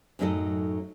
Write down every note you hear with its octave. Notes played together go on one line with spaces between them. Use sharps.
F#2 A2 F#3 D#4 A4 D#5